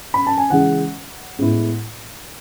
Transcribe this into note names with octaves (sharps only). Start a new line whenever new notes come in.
B5
A5
G#5
C#3 E3 G#3 F#5
A2 G#3 B3 E4